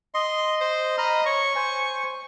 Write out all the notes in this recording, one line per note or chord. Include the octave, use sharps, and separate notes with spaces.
D#5 C6
C5
D#5 A#5 B5 F6
C#5 C#6
C5 G#5